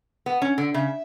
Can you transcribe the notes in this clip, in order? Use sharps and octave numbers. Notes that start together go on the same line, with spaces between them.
B3
C#4
D3
C#3 E5